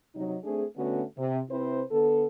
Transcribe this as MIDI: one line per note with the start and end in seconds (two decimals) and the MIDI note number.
0.15 0.36 48
0.15 0.36 54
0.15 0.36 63
0.44 0.64 57
0.44 0.64 60
0.44 0.64 62
0.44 0.64 68
0.77 1.03 50
0.77 1.03 57
0.77 1.03 59
0.77 1.03 61
0.77 1.03 66
1.18 1.39 48
1.50 1.82 48
1.50 1.82 60
1.50 1.82 64
1.50 1.82 71
1.50 1.82 72
1.91 2.26 50
1.91 2.26 59
1.91 2.26 69